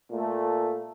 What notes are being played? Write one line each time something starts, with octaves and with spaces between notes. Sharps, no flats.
A#2 A3